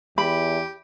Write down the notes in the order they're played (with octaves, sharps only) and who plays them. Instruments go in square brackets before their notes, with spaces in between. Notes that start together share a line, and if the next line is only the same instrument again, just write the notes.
[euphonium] E2 [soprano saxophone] G4 [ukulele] B5